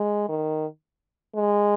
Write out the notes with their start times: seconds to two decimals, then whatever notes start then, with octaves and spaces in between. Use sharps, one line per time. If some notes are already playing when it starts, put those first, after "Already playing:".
Already playing: G#3
0.29 D#3
1.36 G#3